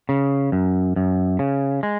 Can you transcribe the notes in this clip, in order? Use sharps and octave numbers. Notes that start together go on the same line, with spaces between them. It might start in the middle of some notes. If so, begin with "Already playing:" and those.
C#3
F#2
F#2
C#3
G#3